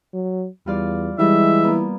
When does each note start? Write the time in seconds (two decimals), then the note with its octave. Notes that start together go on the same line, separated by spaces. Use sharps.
0.13 F#3
0.66 E2 G3 F4 D5
1.19 E3 G3 G#3 E5
1.64 A#3 B3